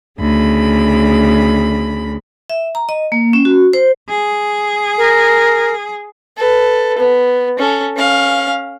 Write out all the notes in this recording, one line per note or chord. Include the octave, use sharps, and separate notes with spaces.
D2 C#3 B5
E5
A#5
D#5
A#3
C#4
F#4
C5
G#4
A#4
A4 B4
B3
C#4 A4
C#4 F5